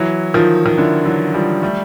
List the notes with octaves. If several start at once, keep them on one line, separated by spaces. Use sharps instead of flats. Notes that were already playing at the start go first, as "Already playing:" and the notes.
Already playing: E3 F#3
D#3 F3
D#3
D3 E3
E3 F#3
F3 G3
G3 A3